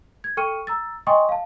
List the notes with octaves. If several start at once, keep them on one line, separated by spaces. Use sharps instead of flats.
G#6
A4 G5 C#6 F6 C#7 D#7
A#5 E6 A6
D#5 G5 G#5 C6 C#6 D#6
F5 A5